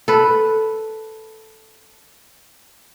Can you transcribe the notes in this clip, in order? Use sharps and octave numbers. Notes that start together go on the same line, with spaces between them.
A4 B4